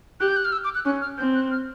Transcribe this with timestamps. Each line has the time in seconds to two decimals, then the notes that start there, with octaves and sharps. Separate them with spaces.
0.20 G4 F#6
0.28 G6
0.37 F#6
0.45 F6
0.52 E6
0.64 D6
0.75 F#6
0.85 C#4 F#6
1.01 F6
1.18 C4 G6
1.35 F#6
1.51 F6